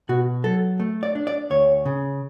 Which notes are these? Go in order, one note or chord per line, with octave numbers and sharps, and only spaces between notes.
B2 F#4
F#3 A4
A3
D5
D4
D5
D2 C#5
C#3